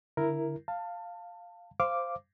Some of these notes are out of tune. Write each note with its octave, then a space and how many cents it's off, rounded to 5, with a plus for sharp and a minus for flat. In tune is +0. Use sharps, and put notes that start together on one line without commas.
D3 -15 E4 +0 A#4 +0
F5 +0 A5 +25
C5 +0 F5 -15 D6 +0